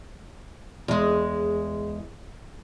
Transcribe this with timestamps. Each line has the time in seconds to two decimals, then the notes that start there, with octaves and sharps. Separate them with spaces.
0.88 E2 G#3